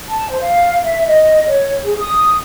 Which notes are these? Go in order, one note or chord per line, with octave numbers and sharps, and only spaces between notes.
A5
C5
F5
E5
D#5
C#5
G#4
D#6